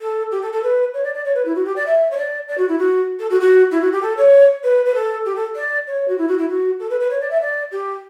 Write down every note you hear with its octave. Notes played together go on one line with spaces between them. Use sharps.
A4
G4
A4
A4
B4
C#5
D5
D5
C#5
B4
E4
F#4
G4
D5
E5
C#5
D5
D5
F#4
E4
F#4
A4
F#4
F#4
E4
F#4
G4
A4
C#5
B4
B4
A4
G4
A4
D5
C#5
F#4
E4
F#4
E4
F#4
A4
B4
B4
C#5
D5
E5
D5
G4